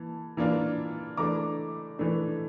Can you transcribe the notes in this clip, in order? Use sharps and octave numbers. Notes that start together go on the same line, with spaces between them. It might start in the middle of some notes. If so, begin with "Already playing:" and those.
Already playing: E3 A#3 A5
E3 A#3 D4 F4
E3 A3 D4 A#5 D6
E3 A3 D4